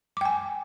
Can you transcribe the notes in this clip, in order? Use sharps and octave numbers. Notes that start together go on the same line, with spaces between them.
G5 G#5 D6